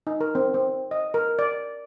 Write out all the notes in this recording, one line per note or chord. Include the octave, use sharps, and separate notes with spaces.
D#4
A#4
C4
C4
D#5
A#4
D5